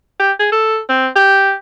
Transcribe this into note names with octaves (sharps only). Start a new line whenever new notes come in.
G4
G#4
A4
C4
G4